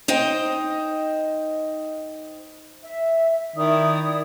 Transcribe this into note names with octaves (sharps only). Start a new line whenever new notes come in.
D#4 C5 D#5 G5
E5
D#3 E4 D5 D#6